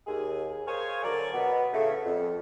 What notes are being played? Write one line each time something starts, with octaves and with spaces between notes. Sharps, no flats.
D#2 G#4
G#4 A#4 C5 C#5 F5 G#5
D3 F#3 A#4 D5
B2 B3
A2 C#3 A3
F2